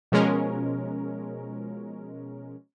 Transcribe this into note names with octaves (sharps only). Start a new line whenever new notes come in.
B2 F3 G#3 C#4 A#4